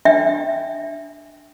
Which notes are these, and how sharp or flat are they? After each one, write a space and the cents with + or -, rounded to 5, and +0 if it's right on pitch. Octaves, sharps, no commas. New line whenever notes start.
D4 +0 E5 +0 G5 -15